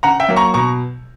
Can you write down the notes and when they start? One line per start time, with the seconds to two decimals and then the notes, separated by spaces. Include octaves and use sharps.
0.03 C#3 F#5 A#5
0.20 E5 G5
0.28 F#3 A#3
0.36 A#5 C#6
0.54 B2 A#5 C#6